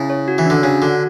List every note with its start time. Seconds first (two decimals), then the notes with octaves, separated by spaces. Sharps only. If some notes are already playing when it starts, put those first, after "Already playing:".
Already playing: C#3 E4
0.10 C#5
0.28 F#4
0.38 E3
0.46 D3 D4
0.63 C#3 F#4
0.82 D3 F#4